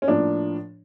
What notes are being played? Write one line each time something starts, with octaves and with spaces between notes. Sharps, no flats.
C#4
A2 F3 A#3 D4